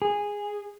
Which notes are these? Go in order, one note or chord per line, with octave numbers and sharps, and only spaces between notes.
G#4